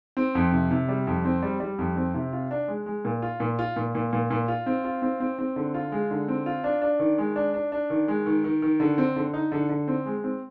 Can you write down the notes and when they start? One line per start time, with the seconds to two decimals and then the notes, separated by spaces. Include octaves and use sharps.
0.17 C4
0.35 F2
0.52 C3
0.71 C3
0.89 G3
1.07 F2
1.25 C4
1.43 G3
1.60 G3
1.78 F2
1.96 C4
2.14 C3
2.33 F4
2.51 D4
2.68 G#3
2.86 G#3
3.05 A#2
3.22 F4
3.40 A#2
3.59 F4
3.76 A#2
3.95 A#2
4.13 A#2
4.31 A#2
4.48 F4
4.66 C4
4.84 F4
5.02 C4
5.20 C4
5.39 C4
5.56 D3
5.74 F4
5.92 G#3
6.11 D3
6.28 C4
6.46 F4
6.64 D4
6.82 D4
7.00 D#3
7.18 G#3
7.36 D4
7.54 D4
7.72 D4
7.90 D#3
8.08 G#3
8.26 D#3
8.44 D#3
8.62 D#3
8.80 D3
8.98 C4
9.16 D3
9.34 D#4
9.52 D3
9.69 D3
9.88 C4
10.06 G#3
10.24 C4